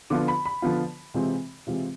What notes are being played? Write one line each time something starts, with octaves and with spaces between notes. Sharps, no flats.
D3 F3 B3 F4 D6
B5
B5
D3 F3 B3 F4
C3 E3 G#3 C4 F4
C3 E3 G#3 C4 F4